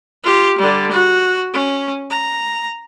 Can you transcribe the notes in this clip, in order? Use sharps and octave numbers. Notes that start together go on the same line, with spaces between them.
F4 G4
D3 G3
F#4
C#4
A#5